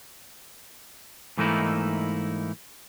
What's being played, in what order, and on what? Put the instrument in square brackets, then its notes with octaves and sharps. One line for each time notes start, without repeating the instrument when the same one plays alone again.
[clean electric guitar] G#2 E3 A3 A#3 D#4 E4